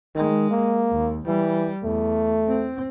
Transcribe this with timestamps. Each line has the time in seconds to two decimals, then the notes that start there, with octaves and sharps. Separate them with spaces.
0.16 D#3 G#3
0.51 A#3
0.92 D#2
1.26 E3 G3
1.83 E2 A3
2.48 C4